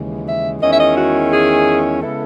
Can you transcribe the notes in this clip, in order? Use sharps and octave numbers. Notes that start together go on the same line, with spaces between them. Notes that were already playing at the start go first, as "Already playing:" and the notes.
Already playing: D#2 C#3 E3 G#3
E5
E2 D#3 G#3 C#4 E4 D#5
E5
D#5
F#4
G#4
C#3 G#3 B3 E4 A4